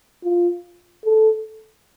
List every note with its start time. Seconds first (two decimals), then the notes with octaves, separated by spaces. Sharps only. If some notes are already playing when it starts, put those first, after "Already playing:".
0.24 F4
1.05 A4